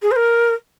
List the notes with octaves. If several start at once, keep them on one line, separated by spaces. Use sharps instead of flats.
G#4
C5
A#4